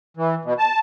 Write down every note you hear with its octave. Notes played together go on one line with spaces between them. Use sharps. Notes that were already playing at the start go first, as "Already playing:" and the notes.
E3
B2
A5